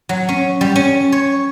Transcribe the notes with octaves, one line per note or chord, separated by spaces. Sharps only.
F#3
C#4
G3
C#4
C#5